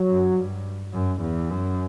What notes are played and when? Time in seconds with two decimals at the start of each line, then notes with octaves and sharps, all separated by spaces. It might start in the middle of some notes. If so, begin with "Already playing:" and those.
Already playing: F#3
0.09 F#2
0.37 G2
0.93 F#2
1.21 E2
1.50 F#2